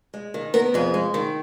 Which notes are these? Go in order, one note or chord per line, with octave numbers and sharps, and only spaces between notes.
G#3
D#3
B3 A#4
F2 G#4
G#3
D#3